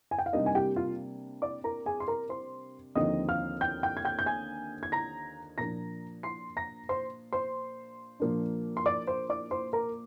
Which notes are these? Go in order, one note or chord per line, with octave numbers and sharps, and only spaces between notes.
G#5
G5
F5
C3 G3 A#3 D4 D#4 D#5
G#5
G4 G5
F4 F5
D5 D6
A#4 A#5
G#4 G#5
C6
A#4 A#5
C5 C6
D#2 D3 F3 C4 D#4 D#5 D#6
F5 F6
G5 G6
G5 G6
G#6
G5 G6
G6
G#5 G#6
G#6
A#5 A#6
A#2 F3 A#3 D4 A#5 A#6
C6 C7
A#5 A#6
C5 C6
C5 C6
A#2 F3 A#3 D4
C6
D5 D6
C5 C6
D5 D6
C5 C6
A#4 A#5